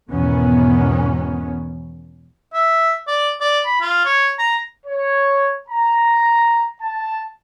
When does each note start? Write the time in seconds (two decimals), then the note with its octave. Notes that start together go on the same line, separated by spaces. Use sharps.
0.10 E2 G#2 B2 D#3 B3 C#4
2.54 E5
3.07 D5
3.41 D5
3.66 B5
3.81 F4
4.05 C#5
4.39 A#5
4.86 C#5
5.69 A#5
6.81 A5